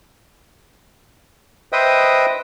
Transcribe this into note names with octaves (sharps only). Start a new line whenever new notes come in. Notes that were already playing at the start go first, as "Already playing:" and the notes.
B4 C5 D#5 E5 G5 D#6